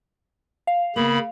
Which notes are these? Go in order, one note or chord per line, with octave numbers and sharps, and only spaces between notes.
F5
C#3 A#3 B3 B5